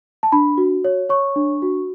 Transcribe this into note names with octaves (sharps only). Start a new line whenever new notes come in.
A5
D4 B5
F#4
C#5
C#5 C#6
D4
F#4